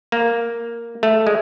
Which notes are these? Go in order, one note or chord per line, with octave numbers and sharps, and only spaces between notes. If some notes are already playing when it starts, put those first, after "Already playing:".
A#3
A3
G#3